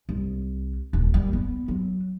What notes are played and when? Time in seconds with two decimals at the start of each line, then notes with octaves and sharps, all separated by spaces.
0.09 C2
0.93 D#1
1.14 D#3 G3
1.33 B3
1.68 F#3